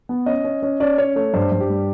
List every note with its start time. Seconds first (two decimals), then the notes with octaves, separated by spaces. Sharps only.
0.09 B3
0.26 C#4 D#5
0.45 C#4
0.63 C#4
0.80 C#4 D5
0.98 C#4 C#5
1.16 A3 C#5
1.34 G2 C5
1.52 G2
1.61 G4
1.70 G3